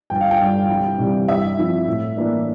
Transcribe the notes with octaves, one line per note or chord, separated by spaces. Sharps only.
G1 G5
F5
G5
G2 D3
C2
C3 E3 G3
G2 E5
F3 C4 E4
A2
E3 A#3 D4